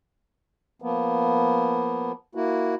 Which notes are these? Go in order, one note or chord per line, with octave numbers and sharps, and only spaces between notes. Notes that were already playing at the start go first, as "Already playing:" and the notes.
F3 A#3 B3
A#3 E4 F#4